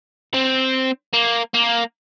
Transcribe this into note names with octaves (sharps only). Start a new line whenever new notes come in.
C4
A#3
A#3